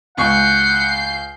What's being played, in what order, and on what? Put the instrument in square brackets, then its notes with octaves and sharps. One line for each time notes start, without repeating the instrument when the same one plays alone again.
[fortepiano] C#2 C#6 [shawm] F#5 [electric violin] G6 C7